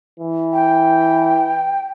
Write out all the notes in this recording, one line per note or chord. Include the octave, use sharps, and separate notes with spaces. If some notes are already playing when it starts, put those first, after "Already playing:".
E3
G5